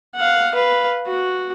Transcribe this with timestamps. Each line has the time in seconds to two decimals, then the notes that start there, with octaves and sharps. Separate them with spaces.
0.15 F5 F#5
0.55 B4 F5
1.07 F#4